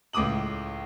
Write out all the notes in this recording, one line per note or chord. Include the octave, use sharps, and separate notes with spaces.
C#2 A2 D6 D#6 F#7